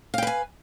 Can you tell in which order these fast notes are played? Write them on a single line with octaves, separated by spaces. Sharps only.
F5 G5 B4 G#5